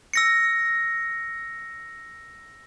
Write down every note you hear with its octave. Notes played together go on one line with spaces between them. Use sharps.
E6 A#6 C#7